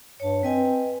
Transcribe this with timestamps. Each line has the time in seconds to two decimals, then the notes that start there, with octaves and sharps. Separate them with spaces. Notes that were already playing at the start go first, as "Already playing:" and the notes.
0.20 G2 C#5 A5
0.43 C4 B4 D#5 G#5